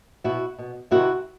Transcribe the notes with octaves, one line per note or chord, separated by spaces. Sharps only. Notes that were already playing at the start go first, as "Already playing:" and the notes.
B2 E4 F#4
B2
C3 D#3 E4 F#4